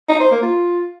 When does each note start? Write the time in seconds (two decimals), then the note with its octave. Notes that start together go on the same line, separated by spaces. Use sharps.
0.09 D#4
0.20 C5
0.31 A#3
0.43 F4